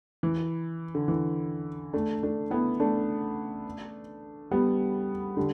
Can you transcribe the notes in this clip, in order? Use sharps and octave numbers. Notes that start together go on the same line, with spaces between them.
E3
D3
E3
A3 D4
A3 D4
B3 E4
A3 D4
G3 B3
D3 G3